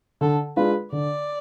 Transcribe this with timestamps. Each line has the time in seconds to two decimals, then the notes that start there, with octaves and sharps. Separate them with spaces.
0.21 D3 A4
0.56 G#3 D4 F4 B4
0.92 D3 D5